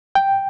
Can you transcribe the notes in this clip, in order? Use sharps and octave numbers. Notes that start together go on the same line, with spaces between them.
G5